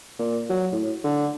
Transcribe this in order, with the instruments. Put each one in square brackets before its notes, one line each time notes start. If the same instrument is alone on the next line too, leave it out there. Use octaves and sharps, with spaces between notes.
[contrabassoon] A#2
F#3
A2
D3